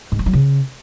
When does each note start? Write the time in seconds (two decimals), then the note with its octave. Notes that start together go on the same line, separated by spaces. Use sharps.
0.12 G#2
0.19 G3
0.26 F#3
0.33 C#3